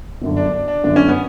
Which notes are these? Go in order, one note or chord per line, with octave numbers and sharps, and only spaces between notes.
G1 F#2 D3
D4
D4
D4
G1 F#2 D3 D4
C#4
B3